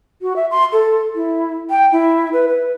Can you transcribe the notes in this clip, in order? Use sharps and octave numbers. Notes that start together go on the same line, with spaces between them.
F#4
E5
C6
A4
E4
G5
E4
B4
B4